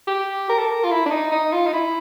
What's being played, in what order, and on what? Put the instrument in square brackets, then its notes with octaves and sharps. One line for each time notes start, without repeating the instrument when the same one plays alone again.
[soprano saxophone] G4
A#4
A4
A#4
F4
E4
D4
D#4
D#4
F4
D#4
E4